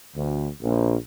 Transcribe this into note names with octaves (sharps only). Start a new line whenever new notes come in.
D2
A#1